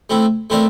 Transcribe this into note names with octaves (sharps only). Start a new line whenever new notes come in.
A3 C4 E4
A3 C4 E4 A#4 D5